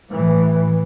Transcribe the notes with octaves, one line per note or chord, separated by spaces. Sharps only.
A2 E3